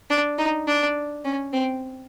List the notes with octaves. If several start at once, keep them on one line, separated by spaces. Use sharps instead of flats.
D4
D#4
D4
C#4
C4